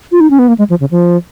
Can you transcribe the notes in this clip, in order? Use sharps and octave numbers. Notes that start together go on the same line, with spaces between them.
F4
D#4
C#4
B3
A#3
G#3
F3
C#3
F3